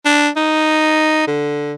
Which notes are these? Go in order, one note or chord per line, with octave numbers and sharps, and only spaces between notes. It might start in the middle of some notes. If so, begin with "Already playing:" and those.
D4
D#4
D3